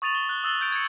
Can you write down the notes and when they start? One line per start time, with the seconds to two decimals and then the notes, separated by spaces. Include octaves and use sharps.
0.02 C#6 D#6 A6 D#7 F7 F#7
0.15 G7
0.29 F#6 G7
0.44 D#6 E6 F#6 A6 F#7 G7
0.61 D#6 G6 A6 D7 F7
0.72 G#6 C#7